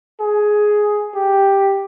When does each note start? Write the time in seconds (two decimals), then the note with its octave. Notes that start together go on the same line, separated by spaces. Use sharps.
0.20 G#4
1.15 G4